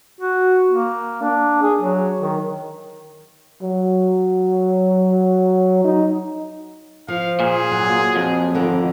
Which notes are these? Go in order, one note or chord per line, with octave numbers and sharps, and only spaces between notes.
F#4
A#3
D4
G#4
F#3
D#3
F#3
D#4
F3 F5
A#2 G#4
F#3
F2
D3 D#3 B3